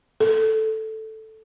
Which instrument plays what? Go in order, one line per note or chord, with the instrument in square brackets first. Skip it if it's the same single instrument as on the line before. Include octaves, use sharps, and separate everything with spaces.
[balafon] A4